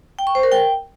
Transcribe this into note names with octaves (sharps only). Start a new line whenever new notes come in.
G5
C#6
C5
A#4
G5